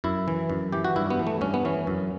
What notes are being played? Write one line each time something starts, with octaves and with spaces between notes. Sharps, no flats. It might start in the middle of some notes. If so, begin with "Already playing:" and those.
F#2 E4
E3
F#2
E3 G4
F#4
G2 E4
B3
E3
A3
G2 C#4
B3
E3 C#4
F#2